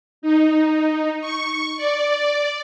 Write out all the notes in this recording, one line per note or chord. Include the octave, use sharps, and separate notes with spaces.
D#4
C#6
D5